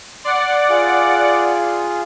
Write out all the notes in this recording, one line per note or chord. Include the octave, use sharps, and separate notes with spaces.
D5 F#5 C6
F4 G#4